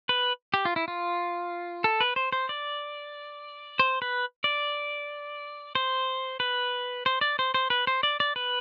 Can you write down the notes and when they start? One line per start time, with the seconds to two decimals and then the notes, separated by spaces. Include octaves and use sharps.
0.09 B4
0.54 G4
0.65 F4
0.76 E4
0.88 F4
1.84 A4
2.01 B4
2.16 C5
2.32 C5
2.49 D5
3.79 C5
4.02 B4
4.44 D5
5.75 C5
6.40 B4
7.06 C5
7.21 D5
7.39 C5
7.54 C5
7.70 B4
7.87 C5
8.03 D5
8.20 D5
8.36 B4